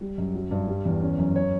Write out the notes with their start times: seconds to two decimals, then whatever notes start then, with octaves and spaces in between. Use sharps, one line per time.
0.01 G3
0.18 F#2
0.35 F#3
0.51 G2
0.67 G3
0.85 E2
1.02 C#4
1.18 F#2
1.36 C#5